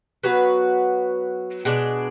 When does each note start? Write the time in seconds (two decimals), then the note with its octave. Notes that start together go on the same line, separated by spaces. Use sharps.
0.23 F#3 B3 F#4 B4
1.65 B2 G#3 D4